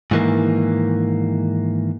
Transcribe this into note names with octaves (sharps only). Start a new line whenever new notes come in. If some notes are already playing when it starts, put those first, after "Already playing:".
G#2 D#3 E3 G3 A#3